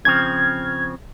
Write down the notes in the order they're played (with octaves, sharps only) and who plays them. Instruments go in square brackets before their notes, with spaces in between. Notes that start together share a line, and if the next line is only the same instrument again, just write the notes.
[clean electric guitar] C#3 F3 C4 [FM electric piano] F6 G#6